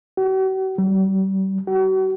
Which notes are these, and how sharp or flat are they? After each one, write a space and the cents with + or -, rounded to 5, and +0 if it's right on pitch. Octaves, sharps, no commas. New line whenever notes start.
F#4 +45
G3 -35
F#4 +40